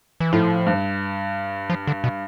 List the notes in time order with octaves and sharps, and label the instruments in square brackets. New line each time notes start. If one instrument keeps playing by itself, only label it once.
[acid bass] E3
[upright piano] A2 [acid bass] F3
[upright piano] G2
[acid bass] F3
D3
B2